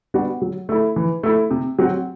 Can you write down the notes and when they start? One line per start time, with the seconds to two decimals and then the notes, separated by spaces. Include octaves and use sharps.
0.14 G3 B3 D4 F#4
0.42 F#3
0.69 A3 E4
0.96 E3
1.23 A3 E4
1.51 C3
1.79 F#3 C4 F#4